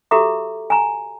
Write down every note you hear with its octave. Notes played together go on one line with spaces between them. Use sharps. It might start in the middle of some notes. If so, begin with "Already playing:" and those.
F#4 G4 A4 E5 A#5 D6
G#5 A#5